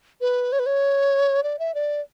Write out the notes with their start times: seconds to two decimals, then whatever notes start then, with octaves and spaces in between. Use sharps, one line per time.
0.21 B4
0.52 C#5
0.59 B4
0.66 C#5
1.43 D5
1.59 E5
1.74 D5